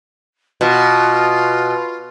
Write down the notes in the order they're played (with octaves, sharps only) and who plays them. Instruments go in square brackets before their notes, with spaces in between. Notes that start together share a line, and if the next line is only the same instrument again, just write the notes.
[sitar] B2 [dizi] F4